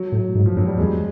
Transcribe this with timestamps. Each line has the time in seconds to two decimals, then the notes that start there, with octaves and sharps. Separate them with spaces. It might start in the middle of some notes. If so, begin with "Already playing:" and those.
Already playing: F#3
0.12 A2
0.35 G#2
0.46 F3
0.56 F#2 F#3
0.67 G3
0.78 E2 G#3